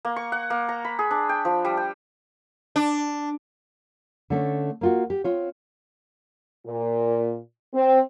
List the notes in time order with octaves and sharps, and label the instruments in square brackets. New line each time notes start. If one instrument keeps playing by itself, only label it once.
[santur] A#3
C#6
F#5
A#3
A#5
B5
G#4
D4
G5
F3
G3
G5
[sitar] D4
[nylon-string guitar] D3 A3 C#4 D4
A#3 F4 F#4
G4
C4 F4 C#5
[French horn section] A#2
C4